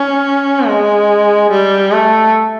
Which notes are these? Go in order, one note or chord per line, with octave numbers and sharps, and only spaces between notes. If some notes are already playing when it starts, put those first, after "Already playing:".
Already playing: C#4
G#3
G3
A3